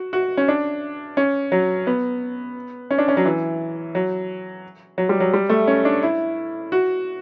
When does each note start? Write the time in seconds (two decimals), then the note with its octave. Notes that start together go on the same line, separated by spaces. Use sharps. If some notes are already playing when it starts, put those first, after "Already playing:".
Already playing: F#4
0.13 F#4
0.37 C#4
0.48 D4
1.17 C#4
1.52 F#3
1.87 B3
2.91 C#4
2.98 D4
3.08 C#4
3.17 F#3
3.26 E3
3.95 F#3
4.98 F#3
5.09 G3
5.20 F#3
5.33 G3
5.50 A3
5.67 C#4
5.85 D4
6.03 E4
6.72 F#4